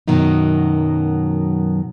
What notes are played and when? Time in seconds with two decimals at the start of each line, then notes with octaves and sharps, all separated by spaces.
0.08 F#2 B2 D#3 F#3 D#4